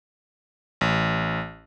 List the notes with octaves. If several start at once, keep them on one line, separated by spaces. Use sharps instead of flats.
A1